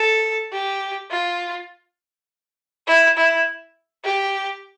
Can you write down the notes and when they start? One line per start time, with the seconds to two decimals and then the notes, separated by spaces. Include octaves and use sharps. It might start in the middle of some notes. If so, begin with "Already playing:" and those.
Already playing: A4
0.52 G4
1.10 F4
2.87 E4
3.17 E4
4.04 G4